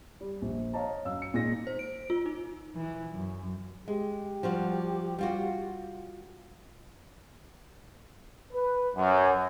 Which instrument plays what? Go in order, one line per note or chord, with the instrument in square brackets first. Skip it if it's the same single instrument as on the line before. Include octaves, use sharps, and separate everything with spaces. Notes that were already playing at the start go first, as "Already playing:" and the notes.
[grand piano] G3
A#1
C#5 D#5 F5 A5 A#5
F#2 F5 E6
C#7
A#2 G#3 D#4 A#6
[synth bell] C5
D7
F4
D#4
[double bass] E3
F#2
[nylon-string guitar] G#3 [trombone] G4
[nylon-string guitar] F3 G3 F#4
G3 F4 F#4
[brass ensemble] B4
F#2